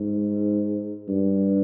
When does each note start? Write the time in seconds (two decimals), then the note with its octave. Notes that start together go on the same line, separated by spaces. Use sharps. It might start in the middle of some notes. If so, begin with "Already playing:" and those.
Already playing: G#2
1.08 G2